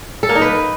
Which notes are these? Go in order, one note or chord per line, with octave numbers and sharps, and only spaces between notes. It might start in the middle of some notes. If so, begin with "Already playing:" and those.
A4
A#3
D#4
B4